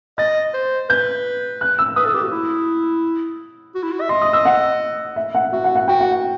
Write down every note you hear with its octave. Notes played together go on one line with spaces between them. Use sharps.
D#5 A6
C5
B4 G6
F#6
E6
B4 D#6
A4
G4
F#4
E4
F#4
E4
F#4
E5
D#5 C6
D#6
E6
F#5
E5
F#5
F#4 E5
F#5
F#5
F#4 G5
F#5
F#5